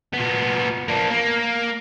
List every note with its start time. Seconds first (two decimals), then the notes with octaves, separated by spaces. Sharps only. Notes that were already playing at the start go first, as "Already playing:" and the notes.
0.13 A#2 B3
0.88 A#3 D4
1.10 A#3